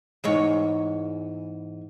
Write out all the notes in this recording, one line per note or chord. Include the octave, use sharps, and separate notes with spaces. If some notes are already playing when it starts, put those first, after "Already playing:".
E2 G#2 C#5